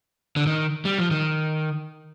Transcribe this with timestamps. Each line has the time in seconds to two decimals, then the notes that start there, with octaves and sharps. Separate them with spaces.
0.36 D3
0.47 D#3
0.85 G3
0.98 F3
1.11 D#3